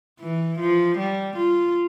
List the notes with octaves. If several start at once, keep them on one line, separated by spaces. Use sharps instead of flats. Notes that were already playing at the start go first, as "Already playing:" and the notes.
E3
F3
G3
F4